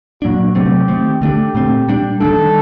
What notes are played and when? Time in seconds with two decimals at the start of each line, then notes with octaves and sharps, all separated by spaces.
0.22 A#2 F#3 A#3 D4 F#4
0.55 C3 F#3 A3 C4 G4
0.88 D#3 A3 C4
1.21 D3 A3 D4 G4
1.55 A#2 A3 C4
1.88 A#2 G3 D4
2.20 D#3 G3 A#3 D4 A4